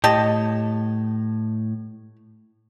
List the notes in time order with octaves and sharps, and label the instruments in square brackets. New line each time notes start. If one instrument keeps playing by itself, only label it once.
[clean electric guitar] A2 [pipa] G4 A5 [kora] D#5